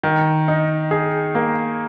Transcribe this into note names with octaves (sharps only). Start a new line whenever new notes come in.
D#3
D#4
G#4
A#3